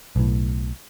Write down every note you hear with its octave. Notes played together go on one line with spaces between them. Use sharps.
B1 A2